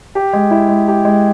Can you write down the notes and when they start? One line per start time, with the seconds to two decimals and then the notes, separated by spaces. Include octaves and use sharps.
0.15 G4
0.33 G#3
0.51 E4
0.69 G#3
0.88 G4
1.05 G#3